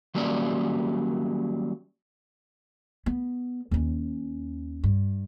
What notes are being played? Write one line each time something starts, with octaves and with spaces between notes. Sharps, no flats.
D#3 F#3 G3 A#3 C#4 D5
B3
D#2 C#4
G2